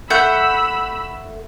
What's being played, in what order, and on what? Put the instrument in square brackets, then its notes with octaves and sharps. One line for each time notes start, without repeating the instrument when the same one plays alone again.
[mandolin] A3 F#5 G6 [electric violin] B5 E6